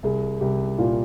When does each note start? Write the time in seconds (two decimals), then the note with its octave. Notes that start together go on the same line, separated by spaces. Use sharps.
0.03 C2 G#4
0.41 C2 G4
0.78 A#2 F4